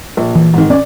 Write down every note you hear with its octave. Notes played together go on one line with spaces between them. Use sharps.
A#1
E3
G#2 D#3
C4 C#4 D5